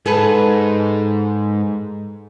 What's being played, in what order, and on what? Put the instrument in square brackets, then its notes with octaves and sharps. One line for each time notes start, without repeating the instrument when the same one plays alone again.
[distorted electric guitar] G#2 [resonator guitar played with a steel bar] G#4 A4 B4